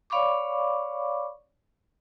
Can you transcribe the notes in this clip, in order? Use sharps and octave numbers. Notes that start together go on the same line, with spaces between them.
C#5 D5 F5 B5 C#6 D6